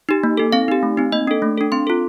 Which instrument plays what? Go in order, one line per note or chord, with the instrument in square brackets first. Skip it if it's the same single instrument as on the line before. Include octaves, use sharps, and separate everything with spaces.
[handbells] D#4 G4
A#3
D#4 A4
C4 F5
D#4 G4
A3
C4 D#4
A#3 D#5
D4 A4
A3
D4 A4
C4 C6
F4 A4